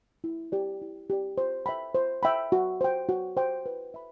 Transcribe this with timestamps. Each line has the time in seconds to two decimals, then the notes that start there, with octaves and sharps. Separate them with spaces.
0.24 E4
0.52 G4 D5
0.82 E4
1.10 G4 D5
1.38 C5
1.66 E5 G5 B5
1.95 C5
2.23 E5 G5 B5
2.52 F#4
2.81 C5 G5
3.09 F#4
3.37 C5 G5
3.66 B4
3.94 E5 B5